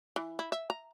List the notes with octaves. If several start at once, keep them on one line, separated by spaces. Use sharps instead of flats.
E3
E4
E5
A#5